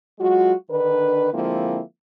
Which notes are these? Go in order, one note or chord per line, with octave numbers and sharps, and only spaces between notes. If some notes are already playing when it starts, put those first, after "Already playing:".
F#3 G#3 F4 F#4
D3 D#3 D4 B4
D3 F3 G#3 A#3 C4 E4